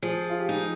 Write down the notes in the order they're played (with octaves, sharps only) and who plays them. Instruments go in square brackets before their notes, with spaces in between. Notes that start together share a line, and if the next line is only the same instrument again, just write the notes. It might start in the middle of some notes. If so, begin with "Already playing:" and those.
[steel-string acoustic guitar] F3 [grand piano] G#4
[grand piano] F4
G4
[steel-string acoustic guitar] D#4 [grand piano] G#4